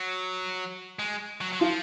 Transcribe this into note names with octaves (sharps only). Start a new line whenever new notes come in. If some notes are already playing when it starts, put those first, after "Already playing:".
Already playing: F#3
G#3
F#3
F#3
F3 F4